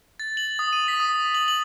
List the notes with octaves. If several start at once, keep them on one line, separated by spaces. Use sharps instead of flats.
A6
F#7
D#6
D#7
B6
D#6
F#7
F#7